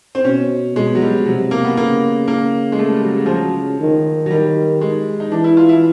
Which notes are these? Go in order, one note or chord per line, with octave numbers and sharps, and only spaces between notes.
C4
B2 C#4
B2 G#3
F#3
G3
C3 F#3
F#3
A#3
B3
C#3 A#3
A#3
G#3
A3
G3
F#3
F#3
F3
F#3
D#3
F#3
D#3 G3
G#3
D#4
E3 D4
E4
F4
E4